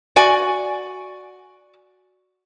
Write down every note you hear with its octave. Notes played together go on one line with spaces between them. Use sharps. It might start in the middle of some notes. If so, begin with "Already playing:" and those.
F#4 D5 G#5